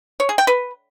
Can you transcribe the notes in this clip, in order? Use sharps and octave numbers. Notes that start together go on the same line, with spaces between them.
C#5
G#4
G5
B4